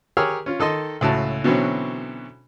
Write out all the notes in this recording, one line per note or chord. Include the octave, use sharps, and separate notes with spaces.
G4 G#4 A#4 C#5 E6 F6
C#4 F4
D#3 A4 D#5 C6
C#2 A2 F#4 A5
B2 D3 E3 F#3 C4 C#4